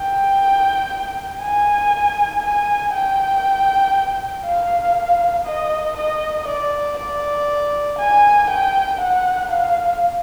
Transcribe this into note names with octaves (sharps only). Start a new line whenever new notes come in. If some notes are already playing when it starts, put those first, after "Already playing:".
Already playing: G5
G#5
G#5
G5
F5
D#5
D#5
D5
D5
G#5
G5
F#5
F5